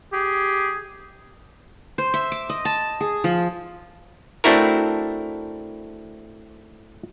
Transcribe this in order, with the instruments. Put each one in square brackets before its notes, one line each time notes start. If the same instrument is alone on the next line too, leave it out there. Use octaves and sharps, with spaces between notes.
[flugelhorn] G4 [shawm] G#4
[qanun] C5
E5
D6
D#5
A5
G#4
F3
[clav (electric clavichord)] A3 C4 D4 E4 F#4 A#4